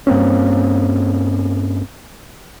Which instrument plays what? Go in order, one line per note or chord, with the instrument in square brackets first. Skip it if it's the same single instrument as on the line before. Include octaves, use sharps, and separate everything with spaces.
[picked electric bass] G2 A#3 C4 C#4